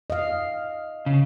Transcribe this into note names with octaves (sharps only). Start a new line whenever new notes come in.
D#5 F5
C#3